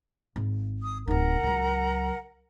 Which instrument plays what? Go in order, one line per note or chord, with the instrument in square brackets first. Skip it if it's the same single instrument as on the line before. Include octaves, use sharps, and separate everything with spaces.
[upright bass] G#1
[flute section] D#6
[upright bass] D1 D#4 [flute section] A#4 F#5 A#5
[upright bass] C#2 F#3